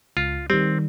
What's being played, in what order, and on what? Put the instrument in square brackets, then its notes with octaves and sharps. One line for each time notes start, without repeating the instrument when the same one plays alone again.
[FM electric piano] C#2 [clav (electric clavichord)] F4
[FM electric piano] D#3 G3 [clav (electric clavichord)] C4